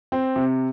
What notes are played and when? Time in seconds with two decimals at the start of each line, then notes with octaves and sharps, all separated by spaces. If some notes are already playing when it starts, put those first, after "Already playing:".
0.12 C4
0.36 C3